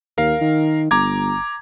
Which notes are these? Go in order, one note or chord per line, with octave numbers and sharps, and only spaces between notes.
D#2 A#4 F5
D#3
G1 A#5 D6 G#6